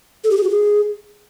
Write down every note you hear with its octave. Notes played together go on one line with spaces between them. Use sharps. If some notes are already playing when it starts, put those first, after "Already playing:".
A4
G4
G#4
F#4
G#4